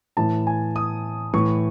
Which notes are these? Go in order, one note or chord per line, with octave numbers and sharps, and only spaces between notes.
A2 E3 A5
G#5
D#6
A2 E3 C#6